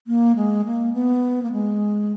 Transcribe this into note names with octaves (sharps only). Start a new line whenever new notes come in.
A#3
G#3
A#3
B3
A#3
G#3